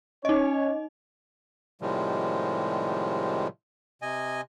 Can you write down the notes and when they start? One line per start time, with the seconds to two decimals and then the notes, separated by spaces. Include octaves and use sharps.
0.25 C#4 D#4 C#5 D#5
1.81 A2 C3 D#3 F3 G3 G#3
4.02 C3 D#5 G#5